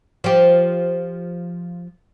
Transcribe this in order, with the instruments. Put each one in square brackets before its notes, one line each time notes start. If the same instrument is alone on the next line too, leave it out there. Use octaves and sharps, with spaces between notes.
[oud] F3 G4